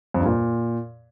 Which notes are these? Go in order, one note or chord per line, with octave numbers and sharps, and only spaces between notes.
F2
G2
A#2